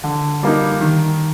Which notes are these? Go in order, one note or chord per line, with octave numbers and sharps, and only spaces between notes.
D3
G3 A#3 D#4
D#3